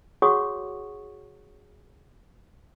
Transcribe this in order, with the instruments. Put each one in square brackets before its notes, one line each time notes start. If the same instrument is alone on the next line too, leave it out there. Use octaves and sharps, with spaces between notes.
[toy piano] F#4 G#4 C#5 F#5 C#6 D#6